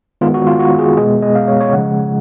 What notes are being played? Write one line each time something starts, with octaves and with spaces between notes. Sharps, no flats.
D#3 G#3 B3 F4
F#4
F4
F#4
G#4
B2 G#3 B3 G#4
D#5
F5
C#5
C#5
C#3 F3 G#3 F#5